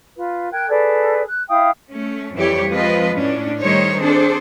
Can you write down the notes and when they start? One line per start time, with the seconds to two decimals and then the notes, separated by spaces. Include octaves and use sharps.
0.17 F4 B4
0.52 A#4 G5 F#6 G#6
0.69 G#4 A4 B4 D5
1.27 F#6
1.49 E4 F5 G5 D#6
1.91 A3 C#4
2.34 F2 E3 G3 E4 G4 C#5
2.68 F3 G#3 C4 F4 B4 D#5
3.14 A2 C#4 D4
3.60 D#3 G3 A3 D#4 C5 C#5
4.01 C4 D4 G#4 A4 C5